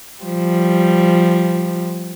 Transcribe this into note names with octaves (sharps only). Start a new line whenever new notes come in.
F3 G3